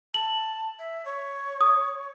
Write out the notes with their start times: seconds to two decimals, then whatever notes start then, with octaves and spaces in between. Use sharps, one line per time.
0.14 A5 F#7
0.79 E5
1.05 C#5
1.61 D#6